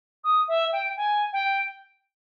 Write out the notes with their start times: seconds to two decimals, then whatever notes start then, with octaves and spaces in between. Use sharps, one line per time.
0.24 D#6
0.48 E5
0.72 G5
0.97 G#5
1.33 G5